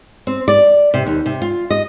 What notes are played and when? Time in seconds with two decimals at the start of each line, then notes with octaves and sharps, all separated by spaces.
0.27 C4
0.48 D5
0.94 C3
1.07 D#2
1.26 C3
1.42 F4
1.70 D#5